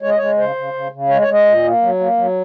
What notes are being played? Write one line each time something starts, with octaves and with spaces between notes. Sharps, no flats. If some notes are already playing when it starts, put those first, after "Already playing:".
G#3 C#5
D#5
G#3 C#5
C#3 C5
C#3
C#3
C#3
G#3 C#5
C#5
G#3
D#5
A#2
A#3
F#3
A#3
F#3